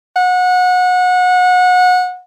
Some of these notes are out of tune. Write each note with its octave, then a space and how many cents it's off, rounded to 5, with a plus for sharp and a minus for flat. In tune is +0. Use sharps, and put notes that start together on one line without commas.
F#5 -25